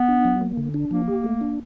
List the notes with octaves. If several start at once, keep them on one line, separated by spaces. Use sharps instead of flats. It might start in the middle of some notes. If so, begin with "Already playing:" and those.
Already playing: B3
D4
F#3
A#3
D3
D4
F3 A#3
G4
A3
D4